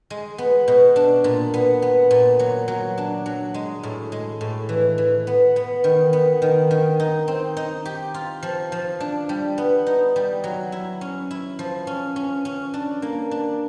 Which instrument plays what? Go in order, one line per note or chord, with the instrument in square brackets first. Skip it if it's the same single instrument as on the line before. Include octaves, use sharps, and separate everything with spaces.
[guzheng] G#3
B3
B2
D4
A#2
B3
B3
A#2
F#3
F#3
D4
F#3
G#3
A2
G#3
A2
E3
E3
B3
B3
D#3
B3
D#3
D#3
D#4
C4
D#4
G4
F4
F3
F3
D4
G3
B3
D#4
G3
F#3
E4
C#4
E4
F3
C#4
C#4
C#4
D4
A#3
D4